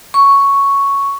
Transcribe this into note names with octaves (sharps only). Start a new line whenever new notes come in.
C#6